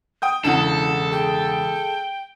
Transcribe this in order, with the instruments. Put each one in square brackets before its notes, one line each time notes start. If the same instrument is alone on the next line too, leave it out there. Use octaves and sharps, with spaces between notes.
[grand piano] G5 D#6 G6
[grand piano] E1 C#3 F#5 [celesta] D4 E4 [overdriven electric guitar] A4 [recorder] A5
[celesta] G#4 [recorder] G5